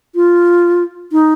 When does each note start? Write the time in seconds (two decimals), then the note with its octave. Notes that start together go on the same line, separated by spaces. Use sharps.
0.15 F4
1.12 D#4